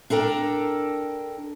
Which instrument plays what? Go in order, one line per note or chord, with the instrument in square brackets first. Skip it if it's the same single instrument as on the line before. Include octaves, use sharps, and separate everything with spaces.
[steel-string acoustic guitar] D4 A4 A#4 G5